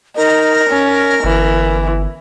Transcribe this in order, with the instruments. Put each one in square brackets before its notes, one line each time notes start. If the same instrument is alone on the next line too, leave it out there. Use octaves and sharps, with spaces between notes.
[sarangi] D#4 [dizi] A#4
[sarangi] C#4
[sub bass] G1 [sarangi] E3